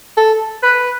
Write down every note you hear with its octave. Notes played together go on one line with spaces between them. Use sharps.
A4
B4